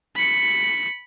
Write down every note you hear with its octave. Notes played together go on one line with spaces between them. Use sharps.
B5 C#7